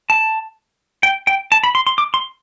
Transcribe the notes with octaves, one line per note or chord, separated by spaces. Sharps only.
A5
G5
G5
A5
B5
C6
C6
D6
C6